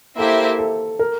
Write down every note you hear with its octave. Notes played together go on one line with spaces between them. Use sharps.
A#3 E4 G4 A4 C5 E5
A4
A#4